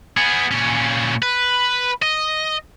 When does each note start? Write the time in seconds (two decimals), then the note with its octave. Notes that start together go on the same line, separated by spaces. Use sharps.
0.17 B3 G#4
0.51 A#2 C#4
1.22 B4
2.02 D#5